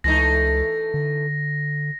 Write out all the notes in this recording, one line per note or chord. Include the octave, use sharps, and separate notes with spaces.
C#2 E3 A3 D#4 A#6
D3